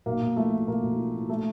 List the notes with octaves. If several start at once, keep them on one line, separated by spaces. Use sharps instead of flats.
B1 A#3
B1
F3 A3
A2
B1 A#3
B1
F3
A2
A3